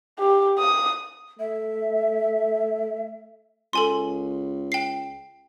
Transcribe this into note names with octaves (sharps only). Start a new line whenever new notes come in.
G4
D#6
A3 E5
C#2 A4 G#5 C6
G5 C7